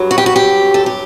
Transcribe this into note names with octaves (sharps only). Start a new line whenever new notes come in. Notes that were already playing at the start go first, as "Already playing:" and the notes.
Already playing: G2 F#3
F#4
G4
F#4
G4
A4
G4